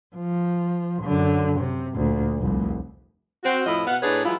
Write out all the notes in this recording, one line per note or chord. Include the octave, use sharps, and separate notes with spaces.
F3
F#2 D3
C3
D2 A#2
F1 C2
C4 F#4
F2 A2 F3 E4 F4 D#5
B2 B3 F5 F#5
A2 D4 D#4 G#4 B4 C#5
E3 F#3 G#3 E4 F4